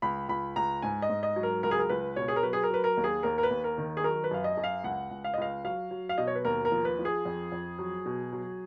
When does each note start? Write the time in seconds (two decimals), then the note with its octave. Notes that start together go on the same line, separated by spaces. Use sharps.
0.02 C#2 B5
0.29 C#2 B5
0.56 C#2 A#5
0.82 G#2 G#5
1.02 D#5
1.10 G#2
1.23 D#5
1.36 F#3
1.43 A#4
1.63 C#2 A#4
1.71 G#4
1.79 A#4
1.89 C#2 B4
2.16 B2 C#5
2.28 G#4
2.36 A#4
2.43 F#3 B4
2.53 G#4
2.63 A#4
2.70 F#3 B4
2.84 A#4
2.97 D#2
3.04 G#4
3.23 D#2 A#4
3.38 A#4
3.43 B4
3.50 D#2
3.64 A#4
3.78 D#3
3.97 G#4
4.04 F#3 A#4
4.24 B4
4.31 F#2 F5
4.44 D#5
4.57 F#2
4.64 F5
4.84 C#2 F#5
5.11 C#2
5.24 F5
5.34 D#5
5.38 C#2 F5
5.64 F#3 F5
5.91 F#3
6.09 F5
6.18 B2 D#5
6.27 C#5
6.35 B4
6.45 D#2 A#4
6.65 A#4
6.72 F3
6.85 B4
6.99 F3
7.05 G#4
7.25 F2
7.52 F2
7.79 F#3
8.06 B2
8.33 F#3